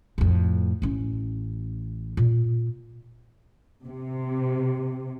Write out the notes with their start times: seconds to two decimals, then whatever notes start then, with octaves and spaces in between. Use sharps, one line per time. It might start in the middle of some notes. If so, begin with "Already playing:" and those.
0.18 F2 A2
0.82 A1 C#4
2.17 A#2
3.85 C3